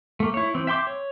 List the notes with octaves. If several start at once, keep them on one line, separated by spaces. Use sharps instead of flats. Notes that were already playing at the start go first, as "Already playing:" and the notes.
A3 A#3
E4 C#5
E3 C4
E5 G5 C6 D6
C#5